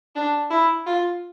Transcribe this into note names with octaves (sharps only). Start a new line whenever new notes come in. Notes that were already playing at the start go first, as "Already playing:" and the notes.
D4
E4
F4